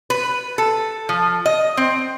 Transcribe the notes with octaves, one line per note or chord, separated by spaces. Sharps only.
B4
A4
F3
D#5
C4